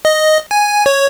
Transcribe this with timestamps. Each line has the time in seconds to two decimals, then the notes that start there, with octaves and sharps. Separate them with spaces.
0.05 D#5
0.51 G#5
0.86 C#5